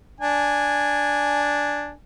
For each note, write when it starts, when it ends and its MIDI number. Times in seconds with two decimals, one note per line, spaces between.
0.21 1.91 62
0.21 1.91 80